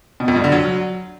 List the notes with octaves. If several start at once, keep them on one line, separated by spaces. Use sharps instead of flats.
B2
F2
G2
D3
F#3